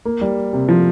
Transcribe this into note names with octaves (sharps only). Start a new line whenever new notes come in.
A#3
G3
C3
F3